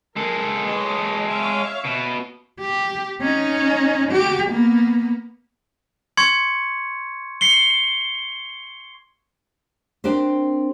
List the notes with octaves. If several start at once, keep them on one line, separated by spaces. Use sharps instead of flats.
G#3 A4 A#4
B4 C#5 D#5
C#5 E5 F5
B2
G4
C#4 D#4
F#4 G4
A#3 B3
C6 C#6 G#6 C#7
C7 C#7 G7
C4 D4 G4 A#4 C5